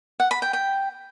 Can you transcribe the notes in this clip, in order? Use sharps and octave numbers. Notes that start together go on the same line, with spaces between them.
F#5
B5
G5
G5